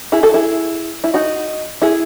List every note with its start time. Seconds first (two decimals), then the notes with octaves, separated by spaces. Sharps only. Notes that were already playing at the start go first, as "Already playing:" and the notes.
0.12 E4 G#4
0.23 F#4 A4
0.34 E4 G#4
1.04 E4
1.14 D#4 F#4
1.82 E4 G#4